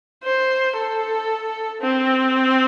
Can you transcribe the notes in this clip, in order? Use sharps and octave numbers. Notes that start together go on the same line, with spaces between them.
C5
A4
C4